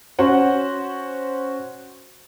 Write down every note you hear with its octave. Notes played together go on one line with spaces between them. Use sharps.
C#4 F#4 C5 F#5